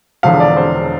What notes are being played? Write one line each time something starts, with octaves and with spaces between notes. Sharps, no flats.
E1 E2 D3 F3 F5
D5
C5